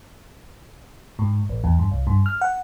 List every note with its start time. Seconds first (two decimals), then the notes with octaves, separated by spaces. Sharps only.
1.19 G#2
1.49 A1
1.64 E2
1.79 G2
1.91 C2
2.07 G2
2.26 F6
2.41 F#5